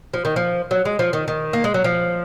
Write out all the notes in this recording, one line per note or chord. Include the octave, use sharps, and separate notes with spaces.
F3
D#3
F3
F#3
G#3
F3
D#3
D#3
A#3
G#3
F#3
F3